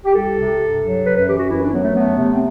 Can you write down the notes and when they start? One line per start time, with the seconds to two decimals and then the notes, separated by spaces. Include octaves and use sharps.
0.05 G4
0.15 C2 A4
0.38 C3
0.60 G2
0.82 F#3
1.05 F#2 B4
1.17 B4
1.27 E3 G4
1.39 F#4
1.50 F#2 E4
1.62 D4
1.73 F#3 B3
1.84 A3
1.95 A3 B3
2.18 C3
2.34 C4